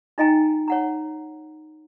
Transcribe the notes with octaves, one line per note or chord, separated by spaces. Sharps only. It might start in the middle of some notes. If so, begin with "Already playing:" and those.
D#4 F4 D#5 G5 G#5 A#5
C#5 F#5 A#5